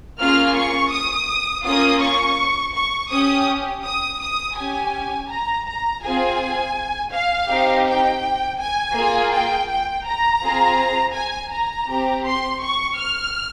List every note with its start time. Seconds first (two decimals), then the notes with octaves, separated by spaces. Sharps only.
0.19 A#3 C#4 F4 G#4 F6
0.55 C#6
0.92 D#6
1.65 A#3 C#4 F4 D#6
2.01 C#6
2.75 C#6
3.11 C#4 G4 D#6
3.84 D#6
4.21 D#6
4.57 C#4 G4 G#5
5.30 A#5
5.67 A#5
6.03 C4 F4 G#4 G#5
7.13 F5
7.50 C4 D#4 G4
7.87 G5
8.59 G#5
8.96 A#3 F4 G#4
9.32 G5
9.69 G5
10.06 A#5
10.43 C4 F4 G#4
11.15 G#5
11.52 A#5
11.88 C4 G4
12.25 C6
12.62 C#6
12.98 F6